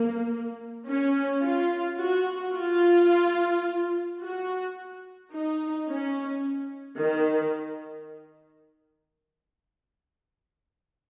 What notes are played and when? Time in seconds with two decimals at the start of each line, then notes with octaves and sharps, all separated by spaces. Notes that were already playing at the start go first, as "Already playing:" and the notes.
Already playing: A#3
0.89 C#4
1.44 F4
2.00 F#4
2.56 F4
4.22 F#4
5.33 D#4
5.89 C#4
6.99 D#3